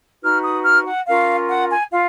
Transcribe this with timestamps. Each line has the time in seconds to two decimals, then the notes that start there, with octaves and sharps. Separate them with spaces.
0.22 D#4 F#4 B4 F6
0.42 D#6
0.64 F6
0.85 F#5
1.06 C#4 F4 A#4 F5
1.49 F#5
1.70 G#5
1.90 F4 F5